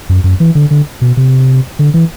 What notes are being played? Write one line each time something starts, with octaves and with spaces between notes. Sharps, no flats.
F#2
F#2
E3
D3
D3
B2
C3
D3
E3